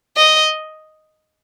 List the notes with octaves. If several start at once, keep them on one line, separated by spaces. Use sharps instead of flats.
D#5